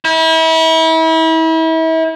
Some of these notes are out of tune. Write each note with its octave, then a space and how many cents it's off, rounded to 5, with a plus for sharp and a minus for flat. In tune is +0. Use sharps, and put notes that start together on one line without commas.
E4 -35